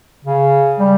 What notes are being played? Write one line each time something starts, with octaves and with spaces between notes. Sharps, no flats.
C#3
G3